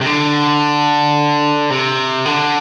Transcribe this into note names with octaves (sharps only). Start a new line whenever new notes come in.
C3
D3
C3
D3